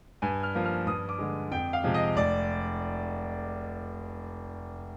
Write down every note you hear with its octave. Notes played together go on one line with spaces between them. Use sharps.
G2 G#5
F6
F3 A#3
F6
G2 D#6
D6
D3 G#3
F2 G5
F5
C3 F3 G#3
D#5
F1 D5